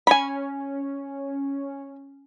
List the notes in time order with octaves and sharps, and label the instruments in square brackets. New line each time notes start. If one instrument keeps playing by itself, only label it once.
[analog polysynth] C#4 [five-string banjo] G#5 B5